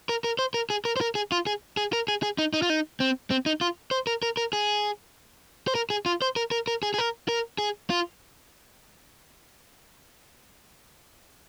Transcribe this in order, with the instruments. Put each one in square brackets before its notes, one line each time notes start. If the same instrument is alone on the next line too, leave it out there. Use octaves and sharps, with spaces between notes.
[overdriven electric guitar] A#4
A#4
C5
A#4
G#4
A#4
C5
A#4
G#4
F4
G#4
G#4
A#4
G#4
G#4
D#4
D#4
F4
D#4
C4
C4
D#4
F4
C5
A#4
A#4
A#4
G#4
C5
A#4
G#4
F4
C5
A#4
A#4
A#4
G#4
G#4
A#4
A#4
G#4
F4